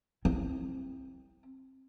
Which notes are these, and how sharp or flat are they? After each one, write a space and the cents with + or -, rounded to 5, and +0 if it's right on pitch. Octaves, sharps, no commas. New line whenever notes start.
C4 +20 E4 +0